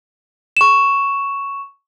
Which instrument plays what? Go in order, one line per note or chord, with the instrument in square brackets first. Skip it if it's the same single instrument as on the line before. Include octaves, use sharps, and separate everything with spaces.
[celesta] C#6 E7